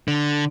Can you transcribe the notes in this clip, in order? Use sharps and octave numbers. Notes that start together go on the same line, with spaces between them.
D3